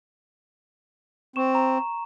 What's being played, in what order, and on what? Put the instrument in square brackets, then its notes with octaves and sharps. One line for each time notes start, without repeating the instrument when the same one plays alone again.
[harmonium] C4 [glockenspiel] C#6 E7
[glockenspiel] A#5